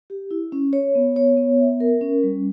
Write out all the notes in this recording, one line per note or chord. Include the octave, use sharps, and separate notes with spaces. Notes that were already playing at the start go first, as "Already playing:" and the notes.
G4
E4
C#4
C#5
B3
C#5
B3
E5
A#4
C#4
G3